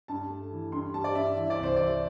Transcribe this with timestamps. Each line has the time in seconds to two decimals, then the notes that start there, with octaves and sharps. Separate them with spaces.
0.08 G2 A5
0.30 A3
0.52 E3
0.72 G2 C6
0.94 G3 A5
1.04 D5
1.15 G2 E5
1.37 E3 E5
1.50 D5
1.59 C2 C5
1.76 E3 D5